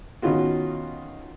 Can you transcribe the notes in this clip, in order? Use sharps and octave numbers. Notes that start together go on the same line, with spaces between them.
B2 D#3 C#4 F4 F#4